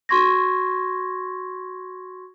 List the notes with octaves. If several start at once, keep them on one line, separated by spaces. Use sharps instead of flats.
F#4 C6 C#6 G#6 A#6